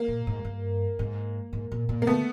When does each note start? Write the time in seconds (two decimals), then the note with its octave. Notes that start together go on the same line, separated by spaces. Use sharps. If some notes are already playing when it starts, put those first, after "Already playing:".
Already playing: A#3
0.08 A#2
0.27 G#2
0.45 G2
0.99 G#2
1.53 G#2
1.71 A#2
1.89 A#2
2.02 A#3
2.07 D3 A3 B3